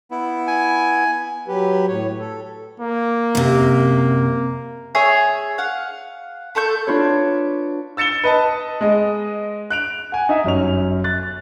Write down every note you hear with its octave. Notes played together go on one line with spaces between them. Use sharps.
B3 E4
G#5
F#3 G4 B4
A2 C#5
A4
A#3
F#2 C3
G#4 C#5 E5
F5 F#5
A3 A4 C#6 G6
D4 F4 B4 C#5
E6 A6 C#7 E7 G7
B4 D#5 A5
G#3 D#5
F#6 D7 F7
F#5 G#5
D#4 D#5 E5
G1 F#2 C#4 F7
F#6 A6